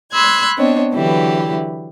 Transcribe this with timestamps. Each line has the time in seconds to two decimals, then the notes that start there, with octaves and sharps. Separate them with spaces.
0.12 B5 C6 E6 F#6 G#6
0.57 B3 C4 D4 C#5 D#5
0.92 D3 E3 F#3 E4 G4 B4